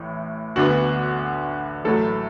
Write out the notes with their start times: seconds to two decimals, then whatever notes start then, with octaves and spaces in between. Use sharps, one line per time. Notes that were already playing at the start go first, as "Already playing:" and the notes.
Already playing: A1 A2
0.56 D2 D3 B3 F#4
1.84 A1 A2 F#3 A4